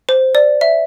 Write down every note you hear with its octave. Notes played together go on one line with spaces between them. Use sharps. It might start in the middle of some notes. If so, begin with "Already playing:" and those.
C5
D5
E5